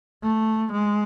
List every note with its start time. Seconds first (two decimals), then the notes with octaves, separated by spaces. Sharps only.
0.23 A3
0.72 G#3